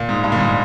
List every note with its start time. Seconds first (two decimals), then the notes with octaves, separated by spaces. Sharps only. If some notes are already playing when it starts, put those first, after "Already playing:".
Already playing: A#2
0.09 G#2
0.24 G2
0.32 A#2
0.39 G#2